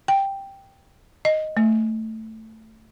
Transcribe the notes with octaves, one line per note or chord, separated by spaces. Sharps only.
G5
D#5
A3